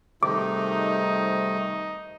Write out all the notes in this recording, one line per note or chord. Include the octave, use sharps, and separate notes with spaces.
G#2 C3 D#3 G3 A3 D#4 D6